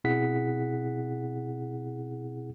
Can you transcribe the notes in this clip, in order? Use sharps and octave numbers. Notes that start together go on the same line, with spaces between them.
B2 C4 E4 G#4 F#5 B6